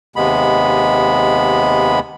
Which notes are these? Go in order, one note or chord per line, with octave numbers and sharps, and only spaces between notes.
D#2 C3 G#3 B3 B5